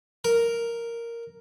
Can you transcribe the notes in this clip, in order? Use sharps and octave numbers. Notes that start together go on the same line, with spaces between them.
A#4